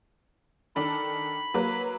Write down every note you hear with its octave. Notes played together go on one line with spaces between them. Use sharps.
D#3 D4 A4 B5
F#3 A#3 B4